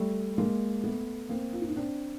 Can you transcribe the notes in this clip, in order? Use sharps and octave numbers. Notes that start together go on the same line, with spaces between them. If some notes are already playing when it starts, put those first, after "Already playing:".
Already playing: G3 A3
G#3 A#3
A3 B3
A#3 C4
F4
E4
D#4
C4 D4